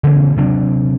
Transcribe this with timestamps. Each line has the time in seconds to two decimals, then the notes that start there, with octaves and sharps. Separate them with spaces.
0.03 C#3 E3 A#3 C4
0.36 C3 F#3 D4